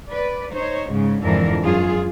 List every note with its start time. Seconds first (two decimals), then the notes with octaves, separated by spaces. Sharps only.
0.10 B4 D5
0.53 D#4 C5 C#5
0.89 G#2 C#3 G#3
1.23 F2 G#2 D3 E3 D4 A#4
1.62 F#2 F4 G#4